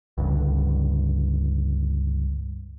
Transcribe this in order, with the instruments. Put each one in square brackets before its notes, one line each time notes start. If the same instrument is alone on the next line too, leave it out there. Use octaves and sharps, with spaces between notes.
[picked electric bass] C#2 G2 D3